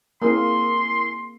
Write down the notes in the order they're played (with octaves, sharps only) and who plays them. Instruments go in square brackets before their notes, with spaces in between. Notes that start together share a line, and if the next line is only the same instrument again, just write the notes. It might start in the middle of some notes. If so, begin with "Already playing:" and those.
[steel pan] A#3 C4 [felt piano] E4 G#4 A#4 [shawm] C6